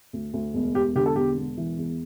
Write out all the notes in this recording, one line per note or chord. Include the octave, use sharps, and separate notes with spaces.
D2
D2
E1
E1 G4
D3 G4
A4
E1 G4
E1
E3
E2